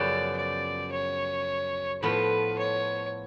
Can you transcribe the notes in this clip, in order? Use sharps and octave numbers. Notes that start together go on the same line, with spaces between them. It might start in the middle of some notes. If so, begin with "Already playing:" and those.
Already playing: F#2 C#3 F3 B3 D5
D5
C#5
A2 F3 B3 F4 B4
C#5